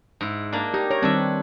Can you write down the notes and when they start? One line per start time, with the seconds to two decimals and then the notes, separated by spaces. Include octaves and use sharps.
0.21 G#2 E4
0.52 A#3 D4
0.74 D#4 G4
0.91 A#4 C#5
1.02 D#3 G3 C4 D4 B4 E5